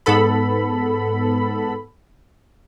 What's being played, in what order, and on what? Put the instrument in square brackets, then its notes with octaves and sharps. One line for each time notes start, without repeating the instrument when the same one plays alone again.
[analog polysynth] G#2 B3 A4 B5